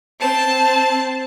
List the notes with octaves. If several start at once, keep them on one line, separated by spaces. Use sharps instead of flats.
C4 A5